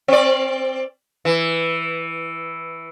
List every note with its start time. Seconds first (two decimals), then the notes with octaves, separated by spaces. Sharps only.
0.08 C4 D5
1.25 E3